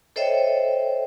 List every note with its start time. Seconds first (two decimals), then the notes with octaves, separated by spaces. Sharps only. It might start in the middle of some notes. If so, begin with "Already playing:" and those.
0.16 A4 C5 C#5 D#5 E5 G5